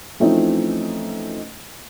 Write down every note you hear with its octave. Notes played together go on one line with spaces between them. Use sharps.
E3 F3 A3 C4 C#4 D#4